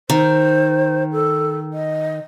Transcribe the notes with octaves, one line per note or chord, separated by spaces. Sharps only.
D#3 C5
A4
D#5